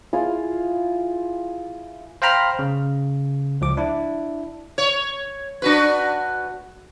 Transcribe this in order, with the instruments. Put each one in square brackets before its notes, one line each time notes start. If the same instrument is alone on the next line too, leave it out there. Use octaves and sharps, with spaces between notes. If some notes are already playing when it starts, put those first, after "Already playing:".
[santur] E4 F4 G#4 F5
[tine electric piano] C5 F5 G5 A#5 B5 F6
C#3
C#2 F3 D6
D4 E4
[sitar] C#5
D4 F#4 B4